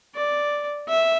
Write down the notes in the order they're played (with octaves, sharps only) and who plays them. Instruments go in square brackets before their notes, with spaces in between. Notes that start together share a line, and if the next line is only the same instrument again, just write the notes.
[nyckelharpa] D5
E5